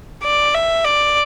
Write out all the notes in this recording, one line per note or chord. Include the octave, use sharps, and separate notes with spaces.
D5
E5
D5